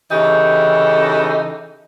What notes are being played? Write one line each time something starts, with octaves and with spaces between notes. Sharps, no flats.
C#3 E3 D#4 G4 A4